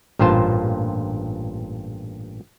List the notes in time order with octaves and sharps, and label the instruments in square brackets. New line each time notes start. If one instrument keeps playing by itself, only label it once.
[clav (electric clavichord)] A1 G2 A#2 F4 C5 A5